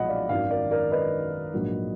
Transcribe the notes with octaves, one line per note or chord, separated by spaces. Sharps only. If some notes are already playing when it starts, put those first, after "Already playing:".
Already playing: B1 A#2 F3 G#3 D#5 F#5 B5
D5 F5
G#1 F#2 D#3 D5 F5
A#4 D5
A#4 D5
B4 D#5
A#1 G#2 F#3 A#3